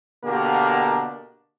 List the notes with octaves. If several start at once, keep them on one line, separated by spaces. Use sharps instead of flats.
B2 D3 A#3 D4 G4 A#4